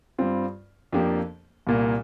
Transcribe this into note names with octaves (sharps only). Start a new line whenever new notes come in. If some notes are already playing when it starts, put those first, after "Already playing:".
G2 G3 C4 F4
F2 F3 A#3 D4 G4
C2 A#2 A#3